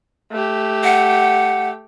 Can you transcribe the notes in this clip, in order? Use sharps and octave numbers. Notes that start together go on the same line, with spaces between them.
A3 G4
F#5